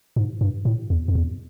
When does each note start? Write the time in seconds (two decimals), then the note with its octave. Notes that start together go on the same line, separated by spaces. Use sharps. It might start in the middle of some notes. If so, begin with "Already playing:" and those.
0.16 G#2
0.41 G2
0.65 A2
0.90 E2
1.08 F2
1.15 E2